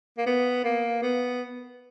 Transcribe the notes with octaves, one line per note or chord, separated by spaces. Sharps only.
A#3
B3
A#3
B3